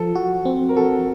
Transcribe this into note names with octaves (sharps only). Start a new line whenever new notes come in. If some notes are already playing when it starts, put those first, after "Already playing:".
Already playing: F3 A4
F#4
C4
A#4
F#4 A4